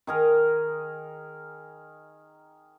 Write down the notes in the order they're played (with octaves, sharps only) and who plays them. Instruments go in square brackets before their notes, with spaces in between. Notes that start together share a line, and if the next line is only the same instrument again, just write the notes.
[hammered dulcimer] D#3 G#4 A#4